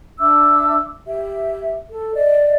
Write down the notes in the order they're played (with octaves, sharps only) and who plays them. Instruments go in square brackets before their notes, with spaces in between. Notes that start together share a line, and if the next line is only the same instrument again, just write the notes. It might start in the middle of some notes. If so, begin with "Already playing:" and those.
[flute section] D4 E5 D6 E6
G4 E5
A4
D5 D#5